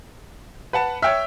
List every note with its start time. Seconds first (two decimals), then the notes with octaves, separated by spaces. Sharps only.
0.73 B4 F#5 A5
1.02 C#5 E5 G5 F6